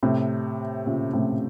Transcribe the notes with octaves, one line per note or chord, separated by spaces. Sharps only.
A2 C3
A#2 C#3
A2 C3